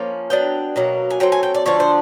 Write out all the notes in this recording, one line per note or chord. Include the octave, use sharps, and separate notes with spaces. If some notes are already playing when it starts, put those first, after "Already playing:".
Already playing: F3 A#3 C#4
F#3 B3 D4 G5
B2 F#3 A#3
G#5
F#3 A3 C4 G5
G#5
G5
D5
D3 F3 A3 D4 C#5
C5